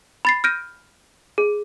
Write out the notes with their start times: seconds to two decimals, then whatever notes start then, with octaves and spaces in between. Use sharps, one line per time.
0.25 B5 A6 C7
0.44 F6 G6 A#6 D7 D#7
1.38 G#4